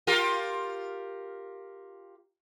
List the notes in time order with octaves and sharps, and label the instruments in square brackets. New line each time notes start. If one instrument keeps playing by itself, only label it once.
[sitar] F4 G4 A#4